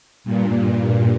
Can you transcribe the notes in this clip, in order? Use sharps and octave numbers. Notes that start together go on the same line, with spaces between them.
G2 A#2